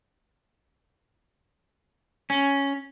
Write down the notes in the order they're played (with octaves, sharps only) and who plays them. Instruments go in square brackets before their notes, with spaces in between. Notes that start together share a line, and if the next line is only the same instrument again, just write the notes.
[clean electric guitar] C#4